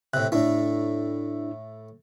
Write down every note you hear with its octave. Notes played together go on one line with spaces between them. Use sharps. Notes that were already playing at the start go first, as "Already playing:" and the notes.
A2 C3 F#6
A2 A3 D4 E4